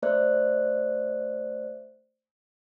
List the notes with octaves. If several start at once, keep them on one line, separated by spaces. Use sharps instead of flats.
A3 C5 D5 E5 F#6